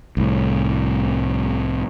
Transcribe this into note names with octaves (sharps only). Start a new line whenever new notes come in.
C2 A2